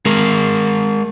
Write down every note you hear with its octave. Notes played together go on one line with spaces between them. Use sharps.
G#3 G#4 A#4